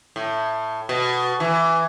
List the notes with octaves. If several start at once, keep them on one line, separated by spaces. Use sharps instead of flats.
A2
B2
E3